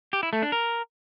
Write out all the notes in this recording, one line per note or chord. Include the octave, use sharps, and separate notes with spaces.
G4
E4
A3
D4
A#4